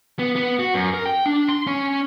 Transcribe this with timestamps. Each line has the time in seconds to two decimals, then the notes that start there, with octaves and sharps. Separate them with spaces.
0.19 B3
0.36 B3
0.59 F#4
0.74 F#2
0.94 A#4
1.06 G5
1.26 D4
1.48 C6
1.67 C#4